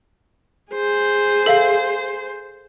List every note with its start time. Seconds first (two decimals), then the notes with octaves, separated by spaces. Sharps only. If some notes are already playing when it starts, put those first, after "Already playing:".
0.72 G#4 C5
1.46 A4 E5 F5